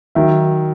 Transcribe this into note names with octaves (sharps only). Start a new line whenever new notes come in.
D#3 F#3 E5